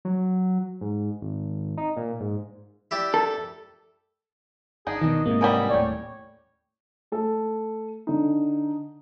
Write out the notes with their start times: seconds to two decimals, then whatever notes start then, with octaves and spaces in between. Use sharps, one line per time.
0.05 F#3
0.81 G#2
1.21 G#1
1.77 D#4
1.97 A#2
2.20 G#2
2.91 E4 G4 D5
3.14 A4
4.87 G1 D4 D#4 G#4
5.01 B2 D#3 D#5
5.26 G#2 C3 A#3
5.41 E3 F#3 G3 A#4 G#5 B5
5.70 D#1 A2 C#5 D5 G5
7.12 A3 A4
8.07 D3 D#4